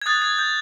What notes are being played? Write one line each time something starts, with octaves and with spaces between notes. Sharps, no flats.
G#6
D#6 F#6 A6
G#6
G6